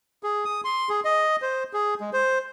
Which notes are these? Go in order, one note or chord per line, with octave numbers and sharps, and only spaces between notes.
G#4
D#6
C6
G#4
D#5
C5
G#4
G#3
C5